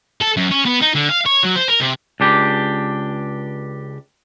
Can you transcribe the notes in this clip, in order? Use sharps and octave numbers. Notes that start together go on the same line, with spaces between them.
A4
F#2
C#4
B3
D#4
D3
F5
C#5
F#3
C5
A#4
C3
C#2 D4 G4